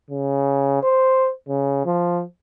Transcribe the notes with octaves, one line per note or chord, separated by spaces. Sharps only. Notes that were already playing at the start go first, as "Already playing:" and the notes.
C#3
C5
C#3
F3